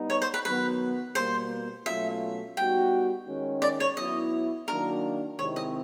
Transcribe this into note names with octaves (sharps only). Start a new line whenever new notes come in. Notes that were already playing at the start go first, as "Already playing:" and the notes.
Already playing: G3 B3 D#4
C#5
C5
B4
D#3 F#3 B3 B4
B2 G3 A#3 C5
B2 F#3 A3 C#4 F4 E5
G3 B3 D#4 F#4 G5
D#3 G#3 C#4
D5
C#5
F#3 B3 E4 D#5
D#3 F#3 A#3 D4 F#4 A#4
C3 D#3 G#3 C4 E4 C#5
D#5